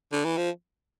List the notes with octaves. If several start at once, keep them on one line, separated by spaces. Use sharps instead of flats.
D3
E3
F3